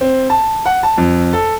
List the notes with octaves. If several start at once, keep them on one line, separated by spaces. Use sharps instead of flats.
C4
A5
F#5
A5
F2
A4